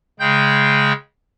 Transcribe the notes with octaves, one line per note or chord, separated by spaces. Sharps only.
C#3 G#3 G5 G6